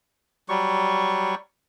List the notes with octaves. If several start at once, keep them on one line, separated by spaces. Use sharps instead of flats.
F#3 G3 C#6